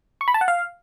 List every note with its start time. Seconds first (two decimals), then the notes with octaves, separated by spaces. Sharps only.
0.21 C#6
0.28 B5
0.34 A5
0.41 F#5
0.48 F5